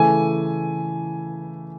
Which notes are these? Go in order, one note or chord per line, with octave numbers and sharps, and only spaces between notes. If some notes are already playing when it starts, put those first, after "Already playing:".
Already playing: C#3 E3 A3 G#5